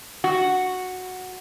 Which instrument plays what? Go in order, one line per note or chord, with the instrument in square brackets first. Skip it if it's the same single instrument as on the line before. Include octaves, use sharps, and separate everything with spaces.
[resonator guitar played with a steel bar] F#4